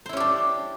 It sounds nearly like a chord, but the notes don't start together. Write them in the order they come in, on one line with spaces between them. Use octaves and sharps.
C5 E4 C#4 G4 D4